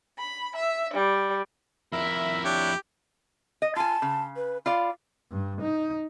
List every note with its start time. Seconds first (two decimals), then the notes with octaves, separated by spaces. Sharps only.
0.18 B5
0.55 E5
0.93 G3
1.92 F2 E4 A#4 E5 B5
2.44 D4 G4 C#5
3.62 D#5
3.76 F4 G#5 A5
4.02 C#3
4.36 B4
4.66 F4 D5 F5 B5
5.31 G2
5.61 D#4